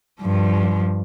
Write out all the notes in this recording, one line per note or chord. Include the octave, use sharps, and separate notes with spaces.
G2 F3